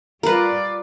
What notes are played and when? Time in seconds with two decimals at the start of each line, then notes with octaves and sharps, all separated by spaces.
0.23 G3 F4 A#4 B4 D5